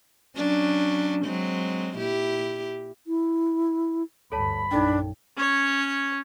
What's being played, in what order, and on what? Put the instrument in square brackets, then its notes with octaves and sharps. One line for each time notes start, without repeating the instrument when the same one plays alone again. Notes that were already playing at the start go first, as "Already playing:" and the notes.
[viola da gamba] F#3 C#4 D4
F#3 G#3 C4
A#2 E4 G4
[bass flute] E4
[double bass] D2 G2 [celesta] A4 C#5 A5 [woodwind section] B5
[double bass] A#1 F#2 [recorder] D4 [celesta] D#4 A4 G5
[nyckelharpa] C#4 C#5